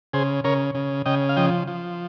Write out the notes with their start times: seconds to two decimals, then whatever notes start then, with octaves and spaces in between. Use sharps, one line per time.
0.13 C#3 G#4 C5
0.44 C#3 A#4 C#5
0.75 C#3
1.06 C#3 D#5 G5
1.29 F5
1.37 F3 D#5 G5
1.68 F3